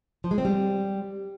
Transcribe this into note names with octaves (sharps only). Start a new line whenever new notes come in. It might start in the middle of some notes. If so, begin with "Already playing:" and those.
F3
G#3
C4
G3